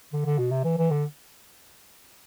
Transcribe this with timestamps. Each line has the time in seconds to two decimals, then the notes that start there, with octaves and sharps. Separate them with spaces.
0.13 D3
0.25 D3
0.38 B2
0.51 C3
0.64 E3
0.78 E3
0.91 D3